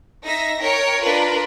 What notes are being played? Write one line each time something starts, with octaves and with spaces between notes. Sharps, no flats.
D#4 E5 A#6
A#4 C#5 G5
D4 F4 A#4 B4